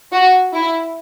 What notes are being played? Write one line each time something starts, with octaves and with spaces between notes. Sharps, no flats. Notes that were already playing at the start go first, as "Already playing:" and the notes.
F#4
E4